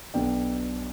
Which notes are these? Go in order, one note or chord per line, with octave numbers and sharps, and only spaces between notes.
B1 B2 B3 D4 G5